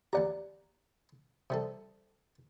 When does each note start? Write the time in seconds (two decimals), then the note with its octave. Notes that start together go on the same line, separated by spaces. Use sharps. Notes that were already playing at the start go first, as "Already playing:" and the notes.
0.13 D#2 G4 D5 F#5 A#5
1.50 C3 G3 A4